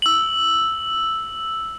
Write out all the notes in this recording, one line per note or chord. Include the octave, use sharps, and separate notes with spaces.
E6 F#7